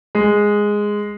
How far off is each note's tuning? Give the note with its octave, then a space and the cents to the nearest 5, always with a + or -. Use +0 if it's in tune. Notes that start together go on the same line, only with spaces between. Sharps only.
G#3 -5